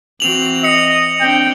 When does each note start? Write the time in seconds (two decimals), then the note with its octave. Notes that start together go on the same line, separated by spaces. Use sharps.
0.20 E3 C4 F#4 F7 F#7
0.64 D#5 C#7
1.21 C4 D4 G5